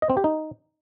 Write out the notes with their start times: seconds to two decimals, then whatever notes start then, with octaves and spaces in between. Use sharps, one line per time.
0.02 D#5
0.10 C4
0.17 G4
0.24 D#4